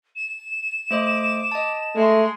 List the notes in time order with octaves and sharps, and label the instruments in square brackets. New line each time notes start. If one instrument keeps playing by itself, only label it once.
[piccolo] E7
[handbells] A3 C5 D#5 [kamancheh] D6
[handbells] D#5 A5
[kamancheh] G#3 C6 [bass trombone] A3